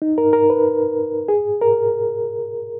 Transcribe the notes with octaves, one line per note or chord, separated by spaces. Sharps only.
D#4
A#4
A#4
B4
G#4
A#4